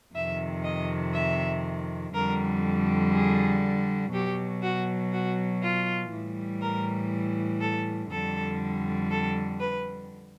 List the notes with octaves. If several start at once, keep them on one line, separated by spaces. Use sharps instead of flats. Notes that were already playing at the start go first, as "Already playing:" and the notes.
F2 C3 D#3 E5
D#5
E5
F2 D3 G3 A#4
G#4
B2 F#3 G4
F#4
F#4
F4
A2 E3 G3
A#4
A4
F2 D3 G3 A4
A4
B4